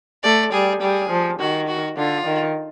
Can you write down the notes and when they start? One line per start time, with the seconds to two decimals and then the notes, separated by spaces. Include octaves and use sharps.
0.23 A3 D5
0.52 G3 G#4
0.81 G3 G#4
1.10 F3
1.40 D#3 F#4
1.68 F#4
1.97 D3 F4
2.26 D#3